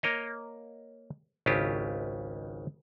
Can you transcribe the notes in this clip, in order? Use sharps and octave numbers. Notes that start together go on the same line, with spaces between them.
A#3 A#4 C#5 D#5
G#1 C#2 C#3 E4 F4 G4